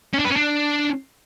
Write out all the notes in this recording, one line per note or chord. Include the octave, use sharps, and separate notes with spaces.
C#4
D4
B4
C#4
D4